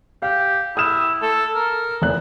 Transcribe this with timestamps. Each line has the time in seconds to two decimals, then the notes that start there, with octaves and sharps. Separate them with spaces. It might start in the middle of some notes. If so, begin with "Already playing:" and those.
0.22 G4 F5
0.77 E4 D#6 F6 E7
1.22 A4
1.55 A#4
2.02 F1 E2 F#6